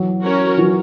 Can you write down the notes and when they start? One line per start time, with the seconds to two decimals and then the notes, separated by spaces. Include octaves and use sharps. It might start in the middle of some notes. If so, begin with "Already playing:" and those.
Already playing: E3 F#3
0.23 C#4 F#4 A#4 C#5
0.57 E3 F#3